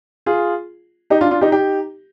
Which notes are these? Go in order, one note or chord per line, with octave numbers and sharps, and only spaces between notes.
F4 G#4
D#4 G4
D4 F4
D4 F4
D#4 G4
D#4 G4